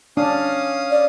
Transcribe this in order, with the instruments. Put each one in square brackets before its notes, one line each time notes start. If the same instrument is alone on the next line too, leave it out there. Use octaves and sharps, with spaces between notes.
[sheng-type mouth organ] C#4 F5 D#6 [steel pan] D4
[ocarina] D5